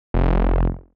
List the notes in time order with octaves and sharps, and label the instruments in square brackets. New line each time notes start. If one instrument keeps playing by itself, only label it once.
[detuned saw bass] F1